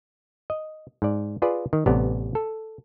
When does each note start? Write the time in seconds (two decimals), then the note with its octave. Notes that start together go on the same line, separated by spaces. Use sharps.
0.50 D#5
1.02 G#2 D5
1.42 F4 G#4 B4 D5
1.73 D#3
1.86 A1 C3 B3 D5
2.35 A4